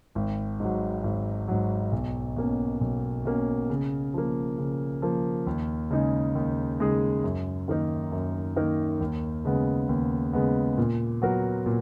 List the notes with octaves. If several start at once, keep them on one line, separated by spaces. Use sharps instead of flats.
G#1
G#2 F#3
G#1
G#2 F#3
B1
B2 A#3 C#4
B1
B2 A#3 C#4
C#3
F3 A#3
C#3
F3 A#3
D#2
C#3 G#3 D#4 G#4
D#2
C#3 G#3 D#4 G#4
F#2
D#3 A#3 D#4 A#4
F#2
D#3 A#3 D#4 A#4
D#2
C#3 G#3 B3
D#2
C#3 G#3 B3
A#2
F#3 B3 F#4 A#4
A#2